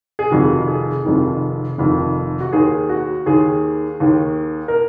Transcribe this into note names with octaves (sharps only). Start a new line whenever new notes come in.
G#4
F1 F2 D#3 F#4
G#4
F1 F2 D#3
F1 F2 D#3
F#4
D#2 D#3 G#4
F#4
D#2 D#3 G#4
D#2 D#3
A#4